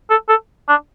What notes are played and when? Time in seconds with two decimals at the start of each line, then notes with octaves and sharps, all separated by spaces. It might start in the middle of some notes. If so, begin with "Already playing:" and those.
0.10 A4
0.29 A4
0.69 D4